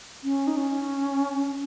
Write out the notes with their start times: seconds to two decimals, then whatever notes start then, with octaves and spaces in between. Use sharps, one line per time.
0.24 C#4
0.47 D#4
0.57 C#4